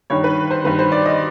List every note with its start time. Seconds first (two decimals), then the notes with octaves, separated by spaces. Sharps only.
0.10 G2 D#3 C#5
0.24 B4
0.50 C5
0.64 G2 D#3 B4
0.79 C5
0.92 D5
1.06 D#5